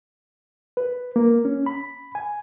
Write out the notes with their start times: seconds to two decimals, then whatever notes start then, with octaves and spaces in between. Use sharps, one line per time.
0.77 B4
1.16 A#3
1.45 C#4
1.66 B5
2.15 G#5